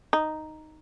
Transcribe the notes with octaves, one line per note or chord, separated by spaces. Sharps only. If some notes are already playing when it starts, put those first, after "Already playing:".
D#4